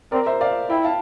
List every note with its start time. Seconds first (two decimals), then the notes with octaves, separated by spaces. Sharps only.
0.12 C4 A#4 D5
0.26 C5 E5
0.41 D5 F5
0.69 E4 E5 G5
0.85 F5 A5